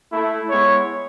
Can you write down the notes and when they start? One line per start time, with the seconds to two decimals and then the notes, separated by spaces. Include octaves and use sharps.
0.12 A3 E4
0.49 G#3 B3 E4 C#5